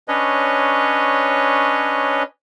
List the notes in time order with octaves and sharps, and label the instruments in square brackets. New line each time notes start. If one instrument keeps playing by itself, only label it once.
[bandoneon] C#4 D4 B4 C#5 D#5